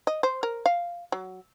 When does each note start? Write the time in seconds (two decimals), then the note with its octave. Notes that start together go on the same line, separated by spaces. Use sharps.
0.07 D#5
0.23 C5
0.43 A#4
0.66 F5
1.12 F#3